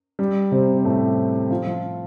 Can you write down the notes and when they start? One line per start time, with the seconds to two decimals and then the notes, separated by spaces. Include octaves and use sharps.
0.19 G3
0.52 C3 C4
0.77 C4
0.85 A2 A3
1.50 F3 F4
1.67 F3 F4